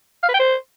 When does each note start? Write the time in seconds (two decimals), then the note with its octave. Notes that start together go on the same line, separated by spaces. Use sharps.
0.23 F5
0.29 B4
0.34 G5
0.39 C5